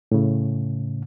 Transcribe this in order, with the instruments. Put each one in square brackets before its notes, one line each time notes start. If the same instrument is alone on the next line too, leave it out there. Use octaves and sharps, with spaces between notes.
[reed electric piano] A2 C#3